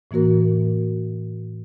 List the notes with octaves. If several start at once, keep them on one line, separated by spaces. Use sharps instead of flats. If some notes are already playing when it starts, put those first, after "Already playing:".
A2 E3 A#3 F#4 A#4